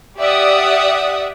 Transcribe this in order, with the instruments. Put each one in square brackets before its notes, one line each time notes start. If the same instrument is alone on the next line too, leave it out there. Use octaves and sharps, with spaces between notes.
[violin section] G4 D5 E5 F#5 D#6